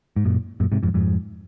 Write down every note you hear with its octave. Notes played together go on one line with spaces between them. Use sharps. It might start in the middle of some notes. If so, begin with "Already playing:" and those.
G#2
F#2 A#2
F#2 A#2
G#2 C3
F2 G#2
F2 G#2